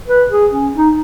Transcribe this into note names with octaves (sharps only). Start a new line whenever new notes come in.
B4
G#4
C#4
D#4